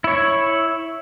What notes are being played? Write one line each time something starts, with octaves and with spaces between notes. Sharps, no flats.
E4 C#5